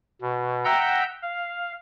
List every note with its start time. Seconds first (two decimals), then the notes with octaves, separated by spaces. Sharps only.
0.21 B2
0.65 E5 F#5 G5 A#5 E6 G6
1.22 F5